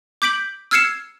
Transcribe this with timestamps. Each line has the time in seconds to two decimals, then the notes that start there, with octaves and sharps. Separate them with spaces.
0.22 D6 G6 B6 D7 F#7
0.71 E6 F6 G#6 C7 C#7 E7